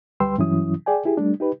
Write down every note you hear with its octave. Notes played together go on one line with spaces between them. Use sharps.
D2 G3 B4 G5 C6 E6
G2 E3 F#3 C#4 E4 D#6
G#4 D5 G5 G#5
E4 G4 G#4
G3 A3 D4
D#4 G4 B4